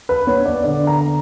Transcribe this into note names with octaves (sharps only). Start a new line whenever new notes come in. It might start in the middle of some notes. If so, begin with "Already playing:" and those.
B4
B3 C#5
D5
D3 D5
A#5